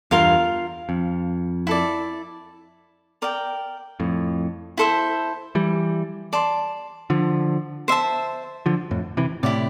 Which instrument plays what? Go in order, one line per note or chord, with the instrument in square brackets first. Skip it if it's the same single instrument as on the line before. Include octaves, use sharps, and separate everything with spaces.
[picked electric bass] E2 G2 [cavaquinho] F4 A#4 F5
[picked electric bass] F2
[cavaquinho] E4 A4 D5
A#4 D5 G5
[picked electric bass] F2 A2
[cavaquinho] E4 A4 C5 E5
[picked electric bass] E3 G3
[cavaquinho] D5 A5 C6
[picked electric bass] D3 F3
[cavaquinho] C5 E5 A5
[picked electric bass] D3 F3
F2 A2
C3 E3
[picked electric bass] A2 C3 [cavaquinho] E4 G4 D5